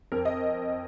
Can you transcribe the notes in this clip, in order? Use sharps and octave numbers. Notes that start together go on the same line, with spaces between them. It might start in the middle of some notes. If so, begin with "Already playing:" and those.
F2 A#4
D#5